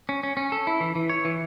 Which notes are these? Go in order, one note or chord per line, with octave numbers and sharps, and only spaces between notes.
C#4
C#4
C#4
A4
E4
E3
E3
C#5
E3